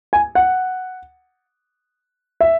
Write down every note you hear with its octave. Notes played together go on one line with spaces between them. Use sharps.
G#5
F#5
E5